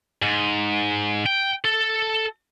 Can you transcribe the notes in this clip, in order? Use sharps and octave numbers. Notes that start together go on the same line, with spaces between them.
G#2
G5
A4